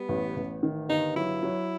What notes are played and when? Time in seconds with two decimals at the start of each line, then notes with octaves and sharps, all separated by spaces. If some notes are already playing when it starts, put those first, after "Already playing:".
Already playing: G3 B3
0.09 A1
0.36 A1
0.63 D#3
0.89 G1 D#4
1.16 F#3 E4
1.43 F#3